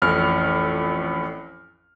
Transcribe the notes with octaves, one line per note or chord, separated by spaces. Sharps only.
A1 F2 F6